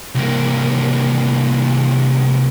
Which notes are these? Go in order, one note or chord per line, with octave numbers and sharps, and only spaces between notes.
C2 A#3